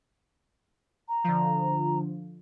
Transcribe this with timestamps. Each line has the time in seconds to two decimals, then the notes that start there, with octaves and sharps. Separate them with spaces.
1.08 A#5
1.24 D3 F3